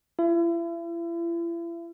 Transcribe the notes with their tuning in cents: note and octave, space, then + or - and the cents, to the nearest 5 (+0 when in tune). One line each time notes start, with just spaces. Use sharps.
E4 +40